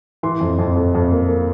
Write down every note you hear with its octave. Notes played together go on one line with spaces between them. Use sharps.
E3 C6
F2
F2
F2
F2
A#3
A#3